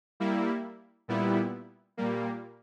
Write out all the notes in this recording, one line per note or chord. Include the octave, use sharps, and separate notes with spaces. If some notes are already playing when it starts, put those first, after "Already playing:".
G3 A#3 E4
A#2 G3 B3 E4
A#2 G3 A#3